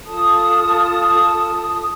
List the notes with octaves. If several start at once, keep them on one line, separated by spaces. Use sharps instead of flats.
F4 A4 A5 D#6